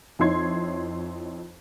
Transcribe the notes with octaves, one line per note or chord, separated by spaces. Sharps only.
F2 D#4 E4 C#5 C6 G#6